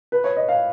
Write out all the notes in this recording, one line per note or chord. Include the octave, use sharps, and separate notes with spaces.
B4
C#5
D#5
F5